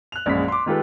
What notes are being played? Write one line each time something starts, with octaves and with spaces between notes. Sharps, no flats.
F#6 F7
A#1 F#2 G#3 B6
C6 D6
D#3 G#3 F4 G4 A4 B4